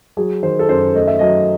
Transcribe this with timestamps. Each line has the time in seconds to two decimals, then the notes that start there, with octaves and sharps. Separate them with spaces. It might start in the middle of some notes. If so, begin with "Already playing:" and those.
0.17 F#3 G#4
0.42 D#3 C5
0.59 A4
0.69 F#2 C5
0.95 A3 D#5
1.07 E5
1.19 F#3 D#5